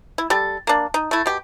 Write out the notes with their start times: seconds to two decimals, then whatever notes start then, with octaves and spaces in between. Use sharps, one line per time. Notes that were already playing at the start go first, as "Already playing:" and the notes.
0.18 E4
0.30 G3 A4
0.67 A#3 D4
0.94 D#4
1.11 A3 E4
1.26 B2 G4